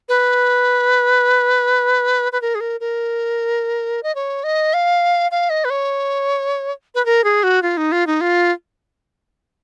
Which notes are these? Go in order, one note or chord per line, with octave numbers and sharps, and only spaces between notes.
B4
B4
A#4
G#4
A#4
A#4
D#5
C#5
D#5
F5
F5
D#5
B4
C#5
B4
A#4
G#4
F#4
F4
D#4
F4
D#4
F4